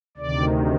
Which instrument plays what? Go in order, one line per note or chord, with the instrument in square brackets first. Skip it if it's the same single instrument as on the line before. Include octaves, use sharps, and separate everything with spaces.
[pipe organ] D2 C3 D#3 D5